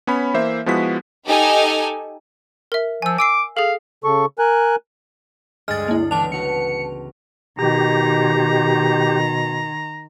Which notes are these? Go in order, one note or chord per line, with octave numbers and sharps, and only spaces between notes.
B3 C#4 C#5 B5
E3 A#3 C5 E5
F3 G#3 B3 E4 F#4 B6
D#4 G4 A4 G#5
A#4 E5
F3 G#5 E6
G#5 D6 E6 C7
G#4 A4 F5
C#3 A4 C#6
A#4 G#5 F#6
D2 G2 G#3 F6 A6
A#3 E4
C#2 E3 D4 A5 F7
B3 F#4 B4 C#7
B2 D#3 G4 A#5